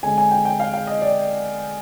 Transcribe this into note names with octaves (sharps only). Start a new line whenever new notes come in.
D3 G#3 C4 G#5
G#5
G5
G5
F5
F5
D#5
D5